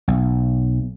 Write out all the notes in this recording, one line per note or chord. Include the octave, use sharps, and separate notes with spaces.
B1